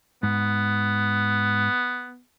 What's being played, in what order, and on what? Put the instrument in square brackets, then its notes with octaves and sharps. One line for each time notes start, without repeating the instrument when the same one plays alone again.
[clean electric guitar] G#2 [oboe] B3